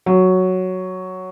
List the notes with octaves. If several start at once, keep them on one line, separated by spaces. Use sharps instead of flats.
F#3